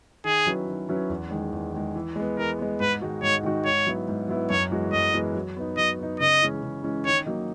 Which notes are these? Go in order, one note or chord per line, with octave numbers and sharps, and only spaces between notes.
D#3 G#4
F#3 C#4 E4 B4
D#3
F#3 C#4 E4 B4
E2
D#3 G#3
E2
D#3 G#3
E3
G#3 B3
E3 A#4
G#3 B3
G#2 B4
D#3 G#3 D#4 F#4
G#2 C#5
D#3 G#3 D#4 F#4
G#2 C#5
F#3 B3 E4
G#2
F#3 B3 E4
F#2 C#5
E3 G#3 B3 F#4
F#2 D#5
E3 G#3 B3 F#4
F#3
B3 D#4
F#3 D#5
B3 D#4
C#3 D#5
E3 G#3 C#4
C#3
E3 G#3 C#4
D#3 C#5
F#3 A#3 D#4